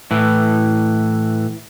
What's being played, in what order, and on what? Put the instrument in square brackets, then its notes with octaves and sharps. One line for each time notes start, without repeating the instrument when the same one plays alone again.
[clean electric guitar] A2 E3